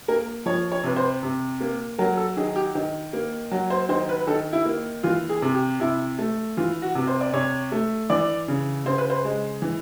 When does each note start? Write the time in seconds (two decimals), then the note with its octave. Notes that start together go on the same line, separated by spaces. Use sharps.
0.08 A#3 A#4
0.46 F3 C#5
0.72 C#5
0.83 C3 B4
0.96 C5
1.23 C3
1.60 A#3
1.99 F#3 A#4
2.17 A4
2.37 D#3 G#4
2.56 G4
2.75 D#3
3.13 A#3
3.51 F#3
3.70 C5
3.89 D#3 C5
4.09 B4
4.27 D#3 A4
4.53 E4
4.65 A#3
5.03 E3 F4
5.29 G#4
5.42 C3
5.55 G4
5.80 C3 E4
6.19 A3
6.57 E3 F4
6.82 F#4
6.95 C3
7.07 C5
7.21 D5
7.33 C3 C#5
7.72 A3
8.10 E3 D5
8.48 C#3
8.85 C#3 C5
8.98 B4
9.10 C5
9.24 G#3
9.62 E3